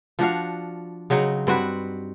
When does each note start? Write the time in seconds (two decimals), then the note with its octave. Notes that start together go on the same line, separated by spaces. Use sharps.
0.19 F3 D4 F#4 F5
1.10 C#3 F#3 C4 D#4
1.47 G2 C4 F#4 B4